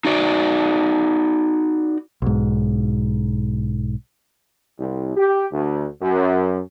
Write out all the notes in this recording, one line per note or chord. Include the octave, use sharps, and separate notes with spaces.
D#4 F#4 D5
B1 G#2
C2
G4
D2
F#2